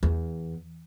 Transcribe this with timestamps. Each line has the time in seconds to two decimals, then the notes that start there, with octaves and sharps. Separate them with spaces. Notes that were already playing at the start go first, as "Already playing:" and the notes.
0.03 E2